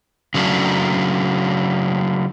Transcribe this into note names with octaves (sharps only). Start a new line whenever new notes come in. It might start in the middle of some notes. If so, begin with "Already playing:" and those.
C#3 F#3 A3 D4